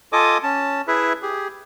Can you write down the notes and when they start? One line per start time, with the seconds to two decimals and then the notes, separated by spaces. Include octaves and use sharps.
0.13 F4 A4 D#5 G#5 D6 D#6
0.43 C#4 A5
0.88 E4 G#4 B4 E5
1.22 G4 G#4